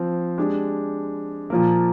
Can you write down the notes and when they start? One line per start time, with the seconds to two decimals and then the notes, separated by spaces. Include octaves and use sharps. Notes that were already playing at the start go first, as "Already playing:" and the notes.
Already playing: F3 C4 C5
0.38 G#3 D4 G4
1.50 A#2 F3 A#3